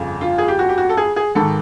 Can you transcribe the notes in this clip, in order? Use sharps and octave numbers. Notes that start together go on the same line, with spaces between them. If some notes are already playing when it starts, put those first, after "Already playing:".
Already playing: G1 F2 C#3
F4
G#4
G4
F#4
G4
F#4
A4
G#4
G#4
G#1 G#2 D#3 A4